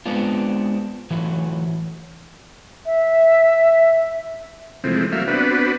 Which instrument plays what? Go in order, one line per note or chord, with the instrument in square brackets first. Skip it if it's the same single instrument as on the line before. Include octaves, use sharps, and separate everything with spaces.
[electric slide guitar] G#3 B3 C4 D4 F4
A2 E3 F#3
[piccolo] E5
[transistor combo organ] C3 E3 F3 G#3 A3 C4
F#3 A3 A#3 E5 F5
B3 C4 D4 F#4 B4